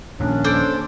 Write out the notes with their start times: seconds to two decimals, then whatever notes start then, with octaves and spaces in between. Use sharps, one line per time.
0.20 D#1 A#1 A#3 C#4 D4
0.44 A4 C5 D5